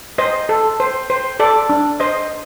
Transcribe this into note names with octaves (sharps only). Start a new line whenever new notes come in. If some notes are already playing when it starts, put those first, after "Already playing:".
C5 D#5
A4
C5
C5
A4 D5
D4
C5 D#5